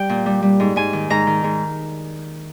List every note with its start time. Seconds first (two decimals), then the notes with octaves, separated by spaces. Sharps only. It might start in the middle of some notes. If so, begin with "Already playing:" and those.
Already playing: G3 G5
0.09 A#2
0.26 G3
0.43 G3
0.60 G#2
0.76 G#2 G#5
0.93 D#3
1.10 G#2 A#5
1.27 D#3
1.44 G#2